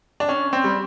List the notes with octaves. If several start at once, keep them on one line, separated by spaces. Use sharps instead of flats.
D4
C#4
C4
G3